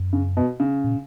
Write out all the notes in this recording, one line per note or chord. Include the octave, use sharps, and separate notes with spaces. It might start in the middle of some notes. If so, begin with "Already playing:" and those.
Already playing: F#2
C#3
B2
C#3
A#2